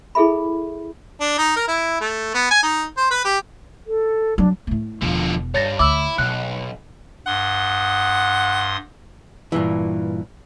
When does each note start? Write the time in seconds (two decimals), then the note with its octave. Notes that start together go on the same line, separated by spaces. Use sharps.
0.15 E4 G#4 A4 E5 B5
1.20 D4
1.38 D#4
1.56 A#4
1.68 E4
2.01 A3
2.34 B3
2.51 G#5
2.63 D#4
2.97 C5
3.11 B4
3.25 G4
3.87 A4
4.38 F#3 D4
4.67 A2 A3
5.02 E1 D3 F3
5.54 G2 C#5 A6 A#6
5.79 D2 E4 D6 E6
6.18 B1 B2 F#6
7.27 G2 F#5 C6 D#6
9.52 G2 A#2 E3